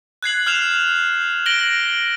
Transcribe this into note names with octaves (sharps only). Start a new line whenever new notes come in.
F#6 G#6 C7 F#7
F6 G6 C7 E7 F7
A#6 D7 F#7 G7